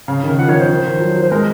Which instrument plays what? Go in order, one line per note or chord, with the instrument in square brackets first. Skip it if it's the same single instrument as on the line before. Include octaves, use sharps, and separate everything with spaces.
[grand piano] C#3 [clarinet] F5
[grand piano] D#3
[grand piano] F3 [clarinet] F#5
[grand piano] D#3 [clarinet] C#5
[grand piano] F3 [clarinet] C5
[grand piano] D#3
F3
F#3
F#3
[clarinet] C5
[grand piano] G#3 [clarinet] A#4